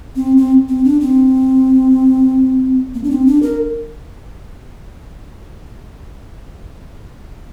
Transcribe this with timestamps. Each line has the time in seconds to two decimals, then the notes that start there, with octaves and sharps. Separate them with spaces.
0.16 C4
0.37 C4
0.69 C4
0.85 D4
1.01 C4
2.95 A#3
3.04 D4
3.11 C4
3.27 D4
3.42 A#4